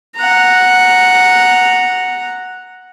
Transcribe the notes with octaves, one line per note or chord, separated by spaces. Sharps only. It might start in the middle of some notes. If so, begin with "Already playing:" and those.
F#5 A#5